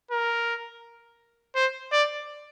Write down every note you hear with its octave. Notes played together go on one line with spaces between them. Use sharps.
A#4
C5
D5